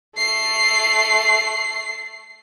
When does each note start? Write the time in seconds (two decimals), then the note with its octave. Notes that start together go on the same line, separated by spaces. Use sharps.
0.17 A3 C7